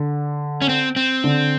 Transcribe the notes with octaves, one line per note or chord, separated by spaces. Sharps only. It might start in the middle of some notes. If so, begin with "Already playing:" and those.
Already playing: D3
C#4
C4
C4
D3